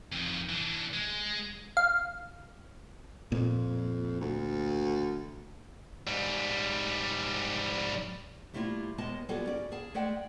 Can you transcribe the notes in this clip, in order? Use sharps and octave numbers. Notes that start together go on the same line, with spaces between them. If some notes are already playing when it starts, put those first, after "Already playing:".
F2 D#3
E3 D4
G#3
F5
F2 A#2
D2
G#2 G3
G3 A3 A#3 E4 F4
D#2 G#3 B3 D#5 A5
F#3 G3 B3 F4 G#4 A4
C#4 D5
G#4 F5 A5
G#3 A3 D5 F#5 G5